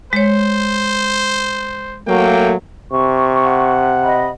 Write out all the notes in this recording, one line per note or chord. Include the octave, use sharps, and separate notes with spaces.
G#3 C5 C#5
F#3 A3 A#3 G5
C3 C#6
F#5
D#5 B5